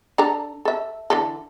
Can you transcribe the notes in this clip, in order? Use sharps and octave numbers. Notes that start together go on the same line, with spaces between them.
D4 A4 A#5
A4 E5
D3 E3 A4